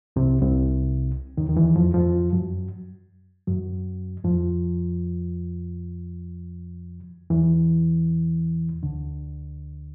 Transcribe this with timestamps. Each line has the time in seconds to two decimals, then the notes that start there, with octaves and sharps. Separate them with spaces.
0.16 C2 C3
0.42 C2 C3
1.37 D#2 D#3
1.49 D#3
1.56 E2 E3
1.76 F2 F3
1.94 F2 F3
2.33 F#2 F#3
3.47 F#2 F#3
4.24 F2 F3
7.30 E2 E3
8.83 D2 D3